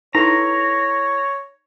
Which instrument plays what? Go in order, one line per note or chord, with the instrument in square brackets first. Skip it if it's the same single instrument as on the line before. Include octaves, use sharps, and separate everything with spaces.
[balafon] D#4 [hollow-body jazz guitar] E4 A4 B4 [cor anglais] C#5 [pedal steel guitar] A#5